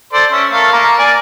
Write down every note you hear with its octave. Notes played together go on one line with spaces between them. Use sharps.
A4 C5 D5
C#4 E5
A3 A#4 F5
A#3 A#5
D5 G#5